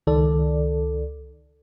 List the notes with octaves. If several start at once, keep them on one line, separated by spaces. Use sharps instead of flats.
C#2 D#3 A4 D5